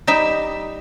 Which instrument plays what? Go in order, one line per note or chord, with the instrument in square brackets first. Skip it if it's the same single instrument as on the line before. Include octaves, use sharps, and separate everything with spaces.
[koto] G3 D#4 E5